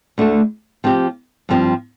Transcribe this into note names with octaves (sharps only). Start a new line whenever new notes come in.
D2 D3 A3
F3 C4 G4
G2 F3 C4